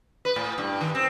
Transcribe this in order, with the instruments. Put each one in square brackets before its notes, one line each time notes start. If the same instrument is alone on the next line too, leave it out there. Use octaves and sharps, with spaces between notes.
[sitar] B4
A2
G2
D#3
C4